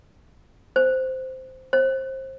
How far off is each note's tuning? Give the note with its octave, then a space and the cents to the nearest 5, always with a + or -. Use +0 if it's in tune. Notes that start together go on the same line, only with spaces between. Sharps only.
C5 -10
C5 +25